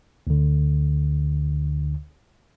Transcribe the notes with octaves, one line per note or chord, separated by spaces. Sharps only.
D2 D3